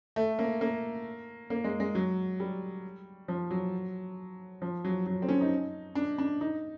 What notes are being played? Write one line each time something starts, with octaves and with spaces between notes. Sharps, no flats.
A3
A#3
A#3
A#3
G#3
G#3
F#3
G3
F3
F#3
F3
F#3
F#3
C4
C#4
D#4
D4
D4
D#4